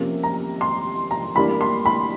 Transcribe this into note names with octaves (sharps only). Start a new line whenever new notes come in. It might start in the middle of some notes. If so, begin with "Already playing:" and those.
Already playing: C3 F3 A#3 C#4
A#5
C6
A#5
E3 G3 A#3 D4 B5
C6
B5